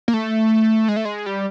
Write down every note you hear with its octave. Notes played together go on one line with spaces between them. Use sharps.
A#3
A3
G#3
A3
G#3
G3